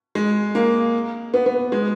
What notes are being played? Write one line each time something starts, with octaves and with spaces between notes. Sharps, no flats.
G#3
A#3
B3
B3
G#3